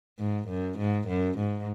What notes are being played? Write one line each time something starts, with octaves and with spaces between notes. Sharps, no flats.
G#2
F#2
G#2
F#2
G#2